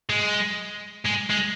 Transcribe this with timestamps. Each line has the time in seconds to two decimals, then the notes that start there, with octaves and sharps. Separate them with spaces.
0.09 G#3
1.06 G#3
1.30 G#3